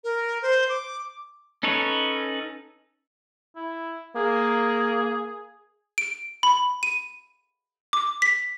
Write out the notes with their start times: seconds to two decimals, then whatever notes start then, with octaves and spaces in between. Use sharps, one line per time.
0.04 A#4
0.42 C5
0.69 D6
1.63 C#4 D#4 A4 B4 C#5
3.55 E4
4.16 A#3 G#4
5.98 D7
6.43 B5
6.83 D#7
7.93 D6
8.22 B6